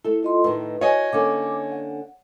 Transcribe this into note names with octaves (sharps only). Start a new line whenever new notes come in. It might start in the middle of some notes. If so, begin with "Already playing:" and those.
A3 E4 A4
F4 D#5 C6
A2 D#3 B4
F#4 C#5 D#5 G#5
D3 A#3 C#4 D6
F#5